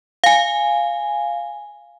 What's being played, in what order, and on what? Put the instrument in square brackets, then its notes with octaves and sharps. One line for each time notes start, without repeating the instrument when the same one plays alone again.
[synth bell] F5 G#5